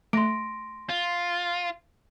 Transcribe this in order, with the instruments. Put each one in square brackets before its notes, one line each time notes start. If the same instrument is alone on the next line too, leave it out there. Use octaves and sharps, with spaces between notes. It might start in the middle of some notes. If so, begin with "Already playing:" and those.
[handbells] A3 [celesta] C6 A#6 D7
[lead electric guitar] F4